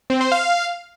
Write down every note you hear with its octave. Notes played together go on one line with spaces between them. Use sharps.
C4
C5
F5